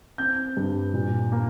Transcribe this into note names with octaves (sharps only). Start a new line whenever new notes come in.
C4 G6
G2
A#2
A#3